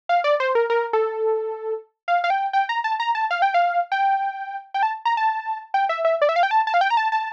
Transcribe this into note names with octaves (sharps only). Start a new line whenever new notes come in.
F5
D5
C5
A#4
A#4
A4
F5
F5
G5
G5
A#5
A5
A#5
A5
F5
G5
F5
G5
G5
A5
A#5
A5
G5
E5
E5
D5
E5
F5
G5
A5
A5
F5
G5
A#5
A5
A5